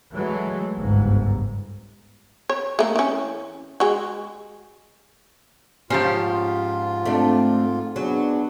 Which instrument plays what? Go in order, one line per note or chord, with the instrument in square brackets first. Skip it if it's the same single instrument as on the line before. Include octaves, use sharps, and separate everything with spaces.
[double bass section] E3 F#3 G#3 A3
G1 C#2 G#2
[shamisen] C#5
A3 A#3
E3 C#4
G#3 F#4
[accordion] G#2 F4 [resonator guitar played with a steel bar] F3 G4 C5 [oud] C#4
[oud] A3 D4 [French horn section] C4
[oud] F#3 [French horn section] B3 D4 G#4